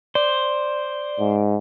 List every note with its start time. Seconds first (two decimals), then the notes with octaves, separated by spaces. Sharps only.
0.15 C5 D5
1.20 G#2